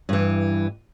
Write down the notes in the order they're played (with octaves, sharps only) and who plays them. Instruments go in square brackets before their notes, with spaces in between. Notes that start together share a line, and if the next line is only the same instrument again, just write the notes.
[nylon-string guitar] G2 E3